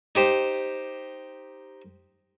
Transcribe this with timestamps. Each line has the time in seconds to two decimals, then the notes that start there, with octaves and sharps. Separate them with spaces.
0.15 D#4 G4 C5